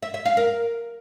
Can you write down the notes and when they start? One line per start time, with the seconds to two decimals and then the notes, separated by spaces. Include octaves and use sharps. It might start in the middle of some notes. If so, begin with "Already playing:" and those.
0.03 E5
0.14 E5
0.25 F5
0.37 A#4